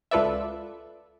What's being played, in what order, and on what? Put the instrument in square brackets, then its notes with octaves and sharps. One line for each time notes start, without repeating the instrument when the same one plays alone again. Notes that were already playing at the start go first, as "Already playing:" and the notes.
[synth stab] C#2 F4 A4 B4 D5 E5